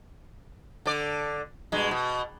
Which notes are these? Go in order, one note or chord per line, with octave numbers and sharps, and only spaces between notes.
D3 D5
G2 B2 G#3
B2